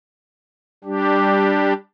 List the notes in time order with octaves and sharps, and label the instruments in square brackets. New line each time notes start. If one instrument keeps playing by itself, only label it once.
[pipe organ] G3 D4 G4